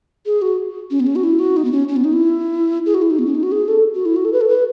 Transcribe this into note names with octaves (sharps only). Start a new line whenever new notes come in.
G#4
F#4
C#4
B3
C#4
F#4
E4
F#4
D#4
B3
C#4
C#4
B3
D#4
E4
G#4
F#4
E4
D#4
B3
C#4
D#4
F#4
G#4
A4
F#4
E4
F#4
A4
B4
A4
B4